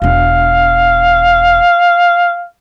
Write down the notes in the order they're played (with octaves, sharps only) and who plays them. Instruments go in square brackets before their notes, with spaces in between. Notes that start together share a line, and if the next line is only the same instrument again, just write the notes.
[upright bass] E1 D4 [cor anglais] F5